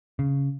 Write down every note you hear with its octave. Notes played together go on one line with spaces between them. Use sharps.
C#3